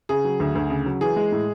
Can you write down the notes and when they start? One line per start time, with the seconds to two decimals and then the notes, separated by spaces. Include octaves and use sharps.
0.09 C#3 G#4
0.25 F#3
0.40 D2
0.55 D2
0.70 C#3
0.86 F#3
1.01 E3 G#4
1.16 G#3
1.32 A2